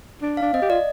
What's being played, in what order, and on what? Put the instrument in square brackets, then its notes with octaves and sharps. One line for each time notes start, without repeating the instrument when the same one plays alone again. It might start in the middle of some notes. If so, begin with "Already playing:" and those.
[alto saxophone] D4
[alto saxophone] D4 [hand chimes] F5
[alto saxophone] C4 [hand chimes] D#5
[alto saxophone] G4
[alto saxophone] F4 [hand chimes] D5